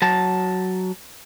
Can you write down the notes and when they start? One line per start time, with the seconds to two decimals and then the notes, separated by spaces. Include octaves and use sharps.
0.02 F#3 A5